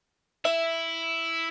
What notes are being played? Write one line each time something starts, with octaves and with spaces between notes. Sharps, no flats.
E4 E5